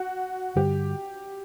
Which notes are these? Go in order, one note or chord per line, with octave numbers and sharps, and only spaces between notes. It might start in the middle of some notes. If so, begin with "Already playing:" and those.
Already playing: F#4
G2 D3 G3 G4